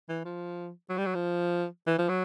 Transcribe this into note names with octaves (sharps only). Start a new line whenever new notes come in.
E3
F3
F#3
G3
F#3
F3
E3
F3
F#3